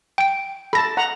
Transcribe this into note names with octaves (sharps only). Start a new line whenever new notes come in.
G5 D7
A4 A5 B5 A#6
F#5 A#5